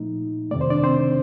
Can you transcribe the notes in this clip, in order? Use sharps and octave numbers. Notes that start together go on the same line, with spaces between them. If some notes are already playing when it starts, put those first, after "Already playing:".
Already playing: A#2 F3 A3 D#4
F2 C3 D#3 A3 D5
C5
D4 D5
C4 C5